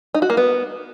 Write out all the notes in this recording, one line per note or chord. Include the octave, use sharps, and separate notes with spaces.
D#4
F#4
A#3
B3